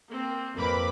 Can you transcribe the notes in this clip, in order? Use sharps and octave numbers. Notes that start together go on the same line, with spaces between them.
A#3 C4
F2 A#3 B4 B5 D6